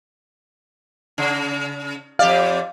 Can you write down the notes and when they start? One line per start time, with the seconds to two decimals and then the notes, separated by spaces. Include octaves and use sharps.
1.18 C#3
2.19 F2 G4 D5 F5